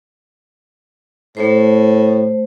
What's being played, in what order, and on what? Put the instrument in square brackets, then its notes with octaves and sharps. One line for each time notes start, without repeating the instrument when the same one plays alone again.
[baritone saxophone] A2 [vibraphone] A3 C5